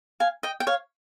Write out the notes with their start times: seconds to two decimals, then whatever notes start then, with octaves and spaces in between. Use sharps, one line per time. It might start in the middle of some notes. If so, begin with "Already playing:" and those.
0.20 F5 G#5
0.43 D#5 G5
0.60 G5
0.67 C#5 F5